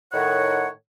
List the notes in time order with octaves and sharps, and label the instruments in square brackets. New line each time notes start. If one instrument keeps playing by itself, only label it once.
[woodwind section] A2 D#3 C#5 F#5